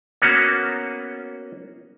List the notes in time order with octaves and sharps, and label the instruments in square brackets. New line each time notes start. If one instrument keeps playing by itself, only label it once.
[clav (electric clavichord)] A#3 B3 C#4 F#4